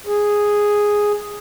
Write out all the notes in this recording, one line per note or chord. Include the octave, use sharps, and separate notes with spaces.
G#4